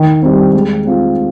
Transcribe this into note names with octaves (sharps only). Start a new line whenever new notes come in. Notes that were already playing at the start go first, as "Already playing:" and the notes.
Already playing: D#3
G3 C4
G#3
C4 F4